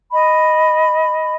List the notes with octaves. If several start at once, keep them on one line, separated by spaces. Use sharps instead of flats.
D#5 B5